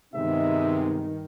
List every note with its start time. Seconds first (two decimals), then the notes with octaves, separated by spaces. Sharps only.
0.14 G2 C3 D#3 G#3 B3 D#4 E5